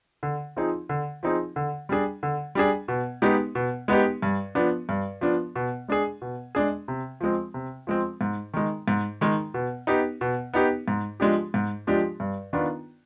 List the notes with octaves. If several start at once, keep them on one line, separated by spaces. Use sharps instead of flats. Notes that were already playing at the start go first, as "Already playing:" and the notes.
D3
F3 C4 D#4 G#4
D3
F3 C4 D#4 G#4
D3
G3 D4 G#4
D3
G3 D4 G#4
B2
G#3 B3 D#4 G4
B2
G#3 B3 D#4 G4
G2
F3 B3 D4
G2
F3 B3 D4
B2
G#3 D4 G#4
B2
G#3 D4 G#4
C3
F3 G#3 C4
C3
F3 G#3 C4
G#2
D#3 G#3
G#2
D#3 G#3
B2
B3 D#4 G4
B2
B3 D#4 G4
G#2
F3 G#3 D4 G4
G#2
F3 G#3 D4 G4
G2
D#3 B3 D4 F4